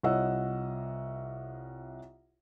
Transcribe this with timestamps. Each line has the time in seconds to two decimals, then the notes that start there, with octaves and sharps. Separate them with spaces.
0.03 C2 F4 C#5 D#5 F#5 E6